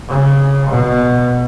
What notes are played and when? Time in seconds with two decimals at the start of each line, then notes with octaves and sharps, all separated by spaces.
0.09 C#3
0.70 B2